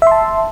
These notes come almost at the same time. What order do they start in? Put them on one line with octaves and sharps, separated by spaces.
E5 C6 A5